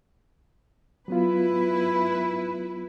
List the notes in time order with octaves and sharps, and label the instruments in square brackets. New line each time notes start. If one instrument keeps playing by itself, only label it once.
[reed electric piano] F#3 B3 F4 [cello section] E4 B4